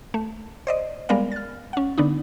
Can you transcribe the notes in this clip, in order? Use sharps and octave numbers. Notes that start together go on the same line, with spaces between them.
A3
C5 D5 D#5
G3 G#3 B3 A#4 D5 F5
F6 A6
C#4 F#5
D3 B3 D4 D#4